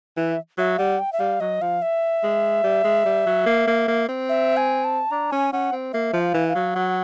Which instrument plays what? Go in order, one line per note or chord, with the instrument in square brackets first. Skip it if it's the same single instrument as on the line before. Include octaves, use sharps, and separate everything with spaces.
[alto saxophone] E3 [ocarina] E5
[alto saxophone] F#3 [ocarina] E5
[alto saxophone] G3 [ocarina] F#5
[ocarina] G5
E5
[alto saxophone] G3 [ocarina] F5
[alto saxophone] F#3 [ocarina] D#5
[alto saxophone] F3 [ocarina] F5
[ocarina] E5
[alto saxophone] G#3
G3
G#3
G3
F#3
A#3
A#3
A#3
C4
[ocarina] E5
G#5
A5
[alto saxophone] D4 [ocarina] A#5
[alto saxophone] C#4 [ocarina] G#5
[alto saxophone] C#4 [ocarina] F#5
[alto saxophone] C4
[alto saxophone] A#3 [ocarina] E5
[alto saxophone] F3
[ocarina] F5
[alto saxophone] E3
[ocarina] F5
[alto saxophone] F#3
[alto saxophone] F#3 [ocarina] F#5